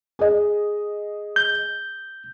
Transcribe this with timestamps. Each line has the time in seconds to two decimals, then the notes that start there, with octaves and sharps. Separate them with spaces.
0.19 G#4 D#5
1.36 G6